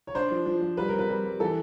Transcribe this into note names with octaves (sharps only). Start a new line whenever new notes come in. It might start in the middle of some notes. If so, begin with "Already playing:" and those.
C#5
D4 C5
F3
F3
F3
G3 B4
C4 A#4
B4
G3
G3
E3 A4